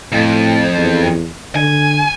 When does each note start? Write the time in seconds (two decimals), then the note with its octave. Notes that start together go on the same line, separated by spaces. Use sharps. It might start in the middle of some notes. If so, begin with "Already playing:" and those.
0.12 F2 A2
0.77 E2
1.56 D3 G#5